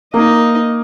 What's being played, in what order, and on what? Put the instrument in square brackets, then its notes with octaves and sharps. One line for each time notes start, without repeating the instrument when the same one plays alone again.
[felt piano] A#3 [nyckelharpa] D#4 D#5